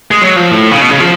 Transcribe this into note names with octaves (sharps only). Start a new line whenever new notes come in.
G#3
F#3
F3
A2
C#3
B2
C#3
F3